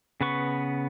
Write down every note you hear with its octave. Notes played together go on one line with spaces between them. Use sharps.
C#3 B3 B4 C#6